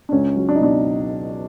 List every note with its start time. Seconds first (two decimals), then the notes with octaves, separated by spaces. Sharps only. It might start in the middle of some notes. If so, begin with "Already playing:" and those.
0.09 D4
0.12 C#2 C#4
0.36 F#3
0.49 D4
0.56 D#4
0.61 B2 D4